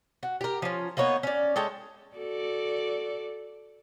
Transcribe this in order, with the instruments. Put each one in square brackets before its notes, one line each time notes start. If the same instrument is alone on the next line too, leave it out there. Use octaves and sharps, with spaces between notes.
[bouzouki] F#4
G4 A#4
F3 C#4
A#3 B3 D#4 C#5
C#4 D5
G#3 A4 C#5 G5
[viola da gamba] F#4 A4 D5